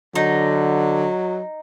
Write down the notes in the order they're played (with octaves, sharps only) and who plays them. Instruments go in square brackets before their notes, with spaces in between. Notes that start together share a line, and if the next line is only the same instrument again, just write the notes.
[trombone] D3 [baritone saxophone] F#3 [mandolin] D#4